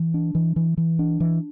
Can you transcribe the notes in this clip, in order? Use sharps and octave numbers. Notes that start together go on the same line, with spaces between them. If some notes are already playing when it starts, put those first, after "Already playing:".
Already playing: E3
D4
E3
E3
E3
D4
E3